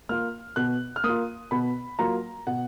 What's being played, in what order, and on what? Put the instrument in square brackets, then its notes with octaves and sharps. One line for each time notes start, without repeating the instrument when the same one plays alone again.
[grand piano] A#3 F4 F6
B2 F#6
F6
A#3 D#6
F4
B2 B5
F#3 A#3 F4 A#5
B2 F#5